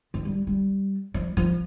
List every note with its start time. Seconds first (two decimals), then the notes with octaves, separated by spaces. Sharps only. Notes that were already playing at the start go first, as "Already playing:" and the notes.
0.14 F3
0.25 G3
0.47 G3
1.14 F3
1.37 F3